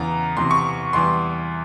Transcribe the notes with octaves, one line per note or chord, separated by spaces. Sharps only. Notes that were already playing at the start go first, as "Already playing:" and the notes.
Already playing: E2 C#3 E3 A#5
E2 C3 E3 C6
C#6
E2 E3 G3 C6